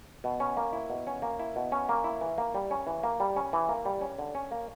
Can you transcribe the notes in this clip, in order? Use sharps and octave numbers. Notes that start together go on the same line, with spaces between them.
B2
C#4
A#3
E4
B2
C#4
A#3
E4
B2
C#4
A#3
E4
E3
A#3
G3
C#4
E3
A#3
G3
C#4
E3
A#3
G3
C#4
D3
C#4
A#3